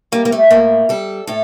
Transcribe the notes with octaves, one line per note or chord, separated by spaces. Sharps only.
G3 A#3
A#3
A3
A2 A#3
G3 A4
A2 A4